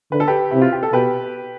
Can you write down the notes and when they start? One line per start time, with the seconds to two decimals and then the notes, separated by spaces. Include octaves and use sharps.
0.12 D3 B4
0.20 A4
0.27 G4 B4
0.51 C3 E4
0.61 F4
0.72 G4
0.83 A4
0.93 B2 G4 B4